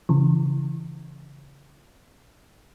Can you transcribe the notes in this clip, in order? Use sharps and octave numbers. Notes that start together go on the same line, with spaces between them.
C#3 E3